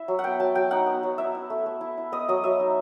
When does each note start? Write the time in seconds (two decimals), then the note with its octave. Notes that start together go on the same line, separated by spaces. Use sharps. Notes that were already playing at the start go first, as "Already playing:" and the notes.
Already playing: E4 E5
0.08 F#3
0.19 F#5
0.24 B3 G5
0.40 F#3 A5
0.55 F#3 G5
0.71 D#4 F#5
0.86 B3
1.03 F#3
1.18 E4 E5
1.35 E4
1.50 A3
1.66 A3
1.81 E4
1.98 E4
2.12 B3 D#5
2.29 F#3 D#5
2.44 F#3 E5
2.60 D#4